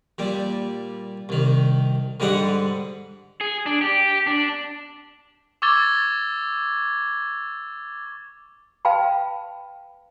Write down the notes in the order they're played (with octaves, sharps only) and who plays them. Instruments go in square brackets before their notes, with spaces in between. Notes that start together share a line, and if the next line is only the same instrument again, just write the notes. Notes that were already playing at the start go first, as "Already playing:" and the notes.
[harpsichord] A#2 G3
C2 D#3
G#2 D3 G3 D#5 F#5
[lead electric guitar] G#4
D4
G4
D4
[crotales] C#6 D6 E6 G#6 A6 G7
[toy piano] B4 F5 G5 A5 B5